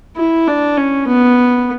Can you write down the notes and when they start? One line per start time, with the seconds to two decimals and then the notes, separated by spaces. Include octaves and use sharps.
0.17 E4
0.47 D4
0.77 C#4
1.07 B3